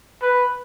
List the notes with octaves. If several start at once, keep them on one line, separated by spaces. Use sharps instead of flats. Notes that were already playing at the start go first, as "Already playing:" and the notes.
B4